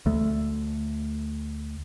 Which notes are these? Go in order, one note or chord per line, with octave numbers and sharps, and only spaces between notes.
D2 A3